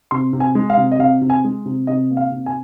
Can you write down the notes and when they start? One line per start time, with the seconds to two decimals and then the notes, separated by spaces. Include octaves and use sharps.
0.11 C3 C6
0.33 C3
0.40 G#5
0.55 G#3
0.70 F5
0.77 C3
0.92 D#5
0.99 C3 F5
1.22 C3
1.30 G#5
1.44 G#3
1.65 C3
1.87 C3 D#5
2.11 A#3
2.17 F5
2.32 C3
2.46 G#5